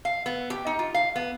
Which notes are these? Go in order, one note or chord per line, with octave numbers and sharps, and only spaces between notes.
F5
B3
G4
D#4
F4
F5
B3